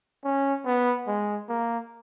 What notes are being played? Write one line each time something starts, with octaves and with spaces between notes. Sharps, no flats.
C#4
B3
G#3
A#3